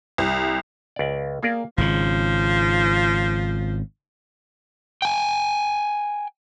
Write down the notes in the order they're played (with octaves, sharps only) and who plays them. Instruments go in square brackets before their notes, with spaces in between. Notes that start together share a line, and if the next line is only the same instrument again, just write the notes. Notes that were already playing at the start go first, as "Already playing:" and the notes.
[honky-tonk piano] C2
[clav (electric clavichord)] C#2 D5
[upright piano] A#3 [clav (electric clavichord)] G#4 A#4 D5
[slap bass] G#1 C#3 [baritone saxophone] F3
[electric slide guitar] G5 G#5